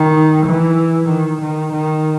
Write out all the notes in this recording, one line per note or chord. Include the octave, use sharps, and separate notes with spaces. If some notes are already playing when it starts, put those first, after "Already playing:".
Already playing: D#3
E3
D#3
D#3
D#3